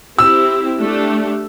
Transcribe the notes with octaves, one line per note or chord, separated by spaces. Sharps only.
C4 E4 G4 E6
A3 D4 G4